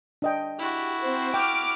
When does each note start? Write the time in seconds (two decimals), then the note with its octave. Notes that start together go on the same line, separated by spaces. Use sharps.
0.22 D4 D#5 G5
0.59 E4 F#4 G4
1.02 C4 C5
1.34 G5 D6 F6 D7